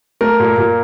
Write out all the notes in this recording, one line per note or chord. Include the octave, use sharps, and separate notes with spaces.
A3 A#4
A#2
A#2